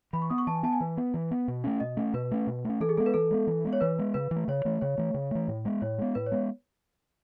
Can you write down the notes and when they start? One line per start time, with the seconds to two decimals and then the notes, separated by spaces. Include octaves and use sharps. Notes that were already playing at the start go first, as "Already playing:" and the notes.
0.13 E3 B5
0.22 C#6
0.30 B3 D#6
0.38 C#6
0.47 E3 A5
0.55 G#5
0.63 B3 A5
0.72 G#5
0.80 E3 B4
0.97 B3
1.14 E3
1.31 B3
1.48 B2
1.64 A3 C#4
1.80 B2 D#5
1.97 A3 C#4
2.14 B2 B4
2.31 A3 C#4
2.47 B2
2.65 A3 C#4
2.80 E3 A4
2.89 G#4
2.97 G#3 B3 A4
3.06 B4
3.14 E3 A4
3.31 G#3 B3
3.47 E3
3.65 G#3 B3
3.73 C#5
3.81 E3 B4
3.99 G#3 B3
4.14 C#3 B4
4.31 E3
4.36 A3
4.48 C#3 C#5
4.65 E3 A3
4.81 C#3 C#5
4.98 E3 A3
5.14 C#3
5.31 E3 A3
5.48 A2
5.65 G#3 B3
5.82 A2 C#5
5.98 G#3 B3
6.15 A2 B4
6.26 C#5
6.32 G#3 B3